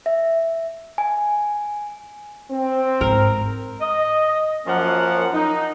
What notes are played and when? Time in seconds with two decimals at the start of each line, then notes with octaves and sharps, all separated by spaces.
0.06 E5
0.98 G#5
2.51 C4
3.01 G#2 A#4
3.81 D#5
4.66 F#2 F3 A#3 C#4 A#4 F#5
5.33 D#4